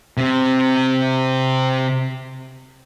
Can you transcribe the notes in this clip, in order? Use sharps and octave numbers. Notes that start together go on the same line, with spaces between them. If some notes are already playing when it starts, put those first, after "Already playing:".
C3 C4